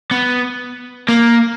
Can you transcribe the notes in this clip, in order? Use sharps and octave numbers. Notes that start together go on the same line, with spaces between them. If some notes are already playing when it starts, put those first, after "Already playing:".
B3
A#3